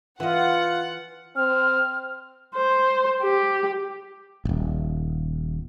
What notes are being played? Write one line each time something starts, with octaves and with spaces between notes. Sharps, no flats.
E3 F4 D#5 F#5
C4 F6
C5
G4
D#1 G#1